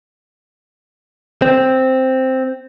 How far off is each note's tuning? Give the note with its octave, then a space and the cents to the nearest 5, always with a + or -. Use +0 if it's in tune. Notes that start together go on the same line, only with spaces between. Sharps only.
C4 +0